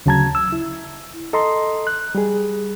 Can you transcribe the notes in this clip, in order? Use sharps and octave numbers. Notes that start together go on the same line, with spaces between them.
D2 C#3 F#3 A5 A#5 G#6
E6
E4
A4 D#5 A#5 C6
F#6
G3 G#4